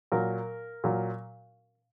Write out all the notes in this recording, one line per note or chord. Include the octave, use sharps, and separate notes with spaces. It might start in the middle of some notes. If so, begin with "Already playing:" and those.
A#2 F#3 A#4
A#2 F#3